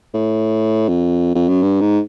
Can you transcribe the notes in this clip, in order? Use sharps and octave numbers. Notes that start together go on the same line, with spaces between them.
A2
F2
F2
F#2
G2
G#2